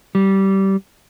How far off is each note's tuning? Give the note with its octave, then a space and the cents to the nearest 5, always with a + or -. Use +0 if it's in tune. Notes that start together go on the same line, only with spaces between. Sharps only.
G3 -20